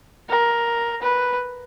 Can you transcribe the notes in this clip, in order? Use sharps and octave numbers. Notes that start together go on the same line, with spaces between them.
A#4
B4